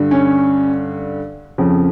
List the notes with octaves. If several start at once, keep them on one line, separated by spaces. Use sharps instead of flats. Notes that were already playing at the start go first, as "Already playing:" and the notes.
Already playing: G2 D3 G3
C#4
F2 C#3 F3